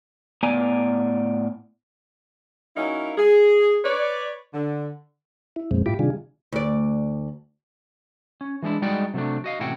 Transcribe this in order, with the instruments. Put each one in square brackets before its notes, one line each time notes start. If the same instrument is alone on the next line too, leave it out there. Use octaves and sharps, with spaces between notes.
[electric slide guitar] A2 B3 D5 G#5 A#5
[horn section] F#3 C#4 D#4 E4 A#4 F5
G#4
B4 C#5 D5
D3
[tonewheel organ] E4
F2 A#2 G#3 C4
A2 E4 F4 G4 B5 D6
C3 D#3 G3 D4 F4 G#4
[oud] D2 D5
[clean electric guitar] C#4
E3 G#3 D4 E4
G3 G#3 D#4 F#4 D5 G5
C3 F#3 G#3 A3 D4
F#4 D#5 F5
A2 C3 E3 C#4 F#4 G5